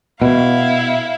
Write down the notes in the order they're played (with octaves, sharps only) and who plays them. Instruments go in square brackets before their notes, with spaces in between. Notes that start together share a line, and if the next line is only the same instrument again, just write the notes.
[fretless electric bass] B2 [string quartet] E4 F5